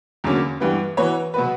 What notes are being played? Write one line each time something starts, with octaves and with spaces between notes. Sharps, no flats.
E2 D3 F#3 A#3 C#4
G2 E3 B3
E3 B3 F#4 C#5
B2 F#3 B3 F#4 B4